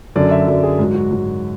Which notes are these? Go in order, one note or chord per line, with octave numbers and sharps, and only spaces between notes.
F#2 D3 F#3 D5
E5
F#2 D3 F#3 D5
G#4
G#2 F#3
F#4
G#2 F#3